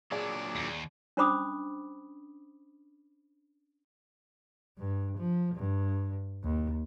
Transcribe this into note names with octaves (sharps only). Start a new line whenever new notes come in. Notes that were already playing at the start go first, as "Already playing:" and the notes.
A#2 F#3 D4 G#4 D5
D#2
C#4 D4 C5 B5 D6 D#6
G2
F3
G2
D#2